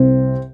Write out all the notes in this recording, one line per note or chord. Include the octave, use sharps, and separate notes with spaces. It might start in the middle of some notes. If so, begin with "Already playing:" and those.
Already playing: C2 C3 C4